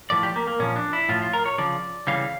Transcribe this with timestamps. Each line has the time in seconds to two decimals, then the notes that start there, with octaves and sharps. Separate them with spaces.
0.10 A2 F3 D5
0.23 G4
0.36 A#3
0.48 A#3
0.59 A#2 F3 C#4
0.76 D4
0.93 E4
1.09 A2 F3 F4
1.22 F4
1.33 A#4
1.46 C#5
1.58 C#3 F3 D5
2.07 C#3 E3 G3 F5